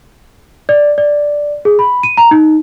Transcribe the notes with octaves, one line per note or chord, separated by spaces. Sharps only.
D5
D5
G#4
B5
D#7
A#5
D#4